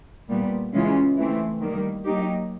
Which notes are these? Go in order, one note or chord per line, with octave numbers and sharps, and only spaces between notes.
A#2 G3 B3
C#3 E3 G#3 C#4 F4
E3 A3 C4
D#3 G3 A#3
F#3 A#3 D#4 G4